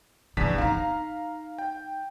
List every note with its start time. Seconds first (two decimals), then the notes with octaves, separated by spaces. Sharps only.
0.37 E2 D#3 D4 B6
0.58 D#4 F5 A#5
1.59 G5